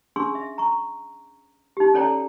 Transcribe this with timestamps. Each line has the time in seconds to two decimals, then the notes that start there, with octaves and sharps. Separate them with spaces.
0.16 C#4 D4 G#4 C6 C#6 E6
0.35 E5
0.58 A#5 C#6
1.77 D#4 G4
1.94 C#4 A4 C#5 D5 G5 A#5